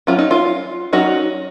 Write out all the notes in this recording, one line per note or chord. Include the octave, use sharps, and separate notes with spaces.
F#3 C#4 F4
D#4
F4
F#3 C#4 D#4 F#4